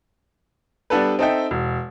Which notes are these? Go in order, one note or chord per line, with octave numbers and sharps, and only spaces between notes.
G3 B3 D4 A4 B4
C4 D#4 A4 D#5 E5 G5
E1